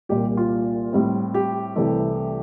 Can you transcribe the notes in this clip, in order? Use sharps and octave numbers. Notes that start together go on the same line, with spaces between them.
C2 A#2 G3 G4
F4
A2 G3 C4
G4
C2 C3 E3 A3